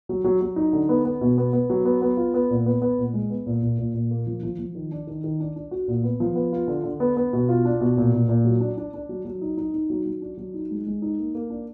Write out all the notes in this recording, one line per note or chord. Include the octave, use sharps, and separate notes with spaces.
F#3
F#3
F#3
D#4
D3
B3
B3
B2
B3
B3
F#3
B3
B3
F4
B3
A#2
B3
B3
A#2
G#3
B3
A#2
A#2
A#2
A#2
A#3
F3
F3
F3
D#3
D4
D#3
D#3
D4
D4
F#4
A#2
B3
F3
B3
F4
D3
D3
B3
B3
B2
F4
D4
B2
A#2
A#2
A#2
F#3
D4
D4
D4
F#3
F#3
D#4
D#4
D#4
F#3
F#3
D4
F#3
D#4
G#3
G#3
D#4
A#3
A#3
D4